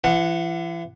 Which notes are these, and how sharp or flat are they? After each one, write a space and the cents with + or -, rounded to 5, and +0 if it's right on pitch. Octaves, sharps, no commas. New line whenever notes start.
E3 +40 F#5 +0